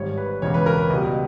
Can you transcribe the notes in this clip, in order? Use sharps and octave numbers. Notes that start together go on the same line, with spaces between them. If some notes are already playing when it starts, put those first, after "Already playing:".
Already playing: G#1 G#2 G3 C#5
B4
E1 E2 C#3 G#3 C#5
B4
A#4
B4
C#2 B2 G3 D#5